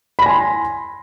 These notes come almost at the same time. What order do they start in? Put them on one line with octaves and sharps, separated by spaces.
B5 A#6 G#5 C6